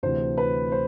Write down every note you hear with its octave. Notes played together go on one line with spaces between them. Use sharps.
D2 C3 E3 C5
B4
C5